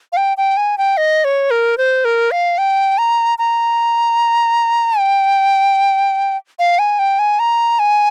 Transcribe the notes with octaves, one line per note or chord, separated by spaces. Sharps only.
F5
G5
G5
G#5
G5
D#5
C#5
A#4
C5
A#4
F5
G5
A#5
A#5
G5
F5
G#5
G5
G#5
A#5
G#5